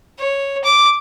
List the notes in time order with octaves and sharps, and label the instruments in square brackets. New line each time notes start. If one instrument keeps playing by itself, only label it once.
[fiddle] C#5
D6